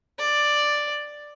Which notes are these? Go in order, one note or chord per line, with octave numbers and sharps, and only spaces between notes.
D5